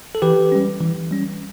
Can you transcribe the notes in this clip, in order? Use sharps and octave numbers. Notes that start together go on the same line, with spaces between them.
A4
E3 G4 B4
G3 C#4
E3
G3 C#4